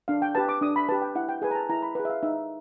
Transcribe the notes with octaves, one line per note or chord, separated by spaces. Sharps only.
D4 F5
G5
G4 B4 A5
D6
D4 D#6
B5
G4 B4 A5
G5
E4 F#5
G5
G#4 B4 G#5
A#5
A5
E4 A#5
B5
G#4 B4
E5
F5
D#4 E5